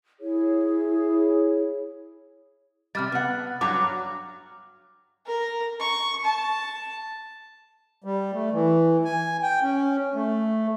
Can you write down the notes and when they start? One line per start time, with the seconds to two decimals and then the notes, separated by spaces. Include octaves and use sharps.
0.20 E4 G#4 C#5
2.95 C3 G3 F6 A6
3.12 B3 F#5
3.61 G2 F#3 A#5 D6
5.26 A#4
5.80 C#6
6.24 A5
8.04 G3
8.34 A3
8.52 E3
9.04 G#5
9.42 G5
9.63 C#4
10.15 A3